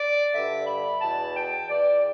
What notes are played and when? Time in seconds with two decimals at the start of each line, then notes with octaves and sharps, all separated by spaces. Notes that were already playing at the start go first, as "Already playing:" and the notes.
Already playing: D5
0.33 G2 D3 E5
0.67 B5
1.01 E2 B2 A5
1.36 G5
1.70 E2 E3 D5